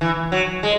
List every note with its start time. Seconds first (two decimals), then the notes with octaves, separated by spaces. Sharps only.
0.01 E3
0.32 F#3
0.63 G#3